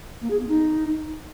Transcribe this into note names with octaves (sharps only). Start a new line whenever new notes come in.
A#3
G#4
B3
D#4